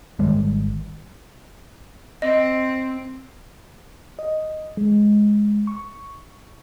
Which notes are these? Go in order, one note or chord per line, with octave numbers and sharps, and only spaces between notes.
G#1 D#3 G3 G#3
C4 D#5
D#5
G#3
C#6